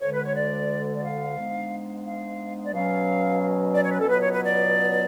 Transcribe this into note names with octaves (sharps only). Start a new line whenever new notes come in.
D2 D3 G#3 C#5
B4
C#5
D5
D5
F5
G#2 G#3 B3 D4
F5
D5
B2 F#3 C#4 F5
D5
C#5
B4
A4
C#2 B2 F#3 B3 B4
C#5
B4
D5